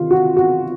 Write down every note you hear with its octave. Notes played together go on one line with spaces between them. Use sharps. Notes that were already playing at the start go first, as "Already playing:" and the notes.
Already playing: C3 D#3 F4
F#4
F#4